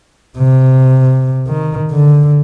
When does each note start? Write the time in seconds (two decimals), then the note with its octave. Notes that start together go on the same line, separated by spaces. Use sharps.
0.38 C3
1.48 D#3
1.91 D3